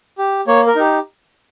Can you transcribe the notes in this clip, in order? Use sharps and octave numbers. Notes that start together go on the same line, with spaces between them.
G4
A#3 C#5
A#4
D#4 G4